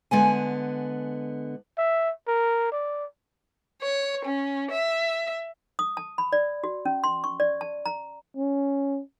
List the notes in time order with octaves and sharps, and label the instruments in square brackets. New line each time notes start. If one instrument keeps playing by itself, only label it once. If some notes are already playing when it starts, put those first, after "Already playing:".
[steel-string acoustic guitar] D3 G#3 B3 G#5
[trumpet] E5
A#4
D5
[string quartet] C#5
C#4
E5
[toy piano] D#6
A5
B5
D5
F#4
C#4
C6
C#6
D5
A5
A#5
[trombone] C#4